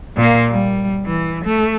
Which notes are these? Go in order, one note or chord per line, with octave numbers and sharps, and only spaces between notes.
A#2 A#3
G3
E3
A3